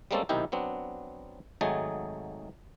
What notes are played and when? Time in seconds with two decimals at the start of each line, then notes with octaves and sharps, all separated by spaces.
0.11 G3 G#3 A#3 C4 C#4 A4
0.29 B1 C3 D#3 D#4 E4 G4
0.52 F#3 B3 C4 D4
1.61 G#1 F#3 A3 D#4 G#4 A5